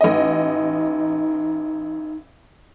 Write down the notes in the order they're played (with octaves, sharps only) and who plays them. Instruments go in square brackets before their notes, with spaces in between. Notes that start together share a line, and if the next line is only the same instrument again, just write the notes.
[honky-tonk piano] A1 D#5 [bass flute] D#4